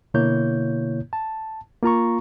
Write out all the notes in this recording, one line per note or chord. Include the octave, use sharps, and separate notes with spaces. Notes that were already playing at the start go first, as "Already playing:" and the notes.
B2 D3 A#3 E4 C#5 G6
A5
A#3 F4 A#5 C#6